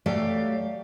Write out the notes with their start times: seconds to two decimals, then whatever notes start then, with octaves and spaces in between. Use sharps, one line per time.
0.06 F#3 A3 G4 D5 F5